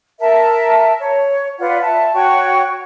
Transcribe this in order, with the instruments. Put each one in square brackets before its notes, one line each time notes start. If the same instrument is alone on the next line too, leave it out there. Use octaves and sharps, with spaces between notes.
[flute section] A#4 E5 A5
C#5
F4 B4 D5 F#5
E5 A5
F#4 C#5 G5 C#6